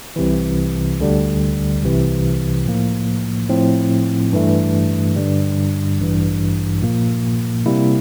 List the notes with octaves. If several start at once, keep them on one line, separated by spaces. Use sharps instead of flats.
C2 C3 E3
D2 D3 G3
C2 C3 E3
A2 F3 A#3
A2 F3 C4
G2 E3 A3
G2 D3 G3
A1 G2 E3
A#2 F3 A#3
C3 G3 A#3 E4